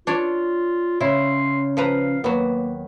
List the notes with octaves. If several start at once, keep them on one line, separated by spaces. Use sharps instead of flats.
D4 F4 C#5 D5
C#3 E4 C6
F3 B4 F5 A#5
D#2 F#3 A#3 B3